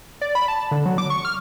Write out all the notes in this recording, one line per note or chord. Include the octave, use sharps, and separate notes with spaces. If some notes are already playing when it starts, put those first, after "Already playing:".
D5
B5
A5
D3
F#3
D6
C#6
F6